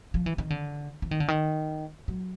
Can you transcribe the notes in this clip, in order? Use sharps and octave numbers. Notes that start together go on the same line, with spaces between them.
F3
E3
D#3
D3
E3
D#3
D3
D#3
F#3